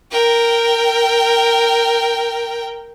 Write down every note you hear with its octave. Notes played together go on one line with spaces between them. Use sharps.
A#4 G5